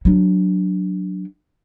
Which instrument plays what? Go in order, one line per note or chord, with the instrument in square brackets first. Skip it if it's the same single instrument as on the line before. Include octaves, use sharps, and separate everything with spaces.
[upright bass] F#3 D4